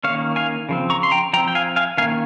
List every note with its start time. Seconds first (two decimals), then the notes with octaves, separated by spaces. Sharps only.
0.04 D#3 A#3 C#4 C#5 F5
0.36 F5 G#5
0.69 C#3 F3 C4
0.90 A#5 C#6
1.03 C6
1.11 G5 A#5
1.33 F3 G5 A#5
1.37 C4
1.48 G5
1.55 F5 G#5
1.76 F5 G#5
1.97 D#3 A#3 C#4 F5 G#5